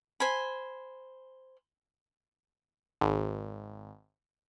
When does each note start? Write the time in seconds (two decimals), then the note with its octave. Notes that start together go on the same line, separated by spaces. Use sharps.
0.20 C5 G#5 B5
3.01 G#1